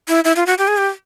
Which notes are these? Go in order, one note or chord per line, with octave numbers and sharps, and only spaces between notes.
E4
E4
F4
F#4
G4
G#4
G4